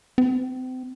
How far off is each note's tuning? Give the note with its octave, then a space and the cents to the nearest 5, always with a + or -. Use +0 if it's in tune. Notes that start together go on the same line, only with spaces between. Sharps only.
C4 -35